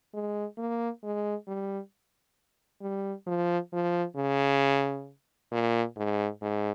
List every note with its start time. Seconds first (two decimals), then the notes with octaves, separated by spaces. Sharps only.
0.14 G#3
0.58 A#3
1.04 G#3
1.48 G3
2.82 G3
3.27 F3
3.72 F3
4.17 C#3
5.52 A#2
5.96 G#2
6.42 G#2